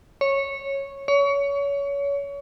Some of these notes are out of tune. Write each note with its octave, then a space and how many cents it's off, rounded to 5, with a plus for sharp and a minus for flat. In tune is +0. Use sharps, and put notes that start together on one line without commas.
C#5 -10
C#5 +25